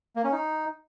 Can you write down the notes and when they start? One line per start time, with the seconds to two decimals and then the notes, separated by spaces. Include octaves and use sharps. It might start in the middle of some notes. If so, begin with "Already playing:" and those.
0.16 A#3
0.24 C#4
0.32 D#4